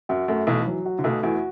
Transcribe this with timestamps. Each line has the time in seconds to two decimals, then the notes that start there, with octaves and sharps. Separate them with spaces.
0.09 F#2 F#4
0.28 F#2 A3
0.47 B1 B2 E3
0.66 F#3
0.86 F#4
0.99 D3
1.04 B1 B2 A3
1.23 E2 E3 F#4